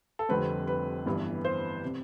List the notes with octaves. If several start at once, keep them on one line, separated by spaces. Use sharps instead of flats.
A4
F1 F2 D3 G3 C4 B4
B4
G1 G2 E3
C5
C3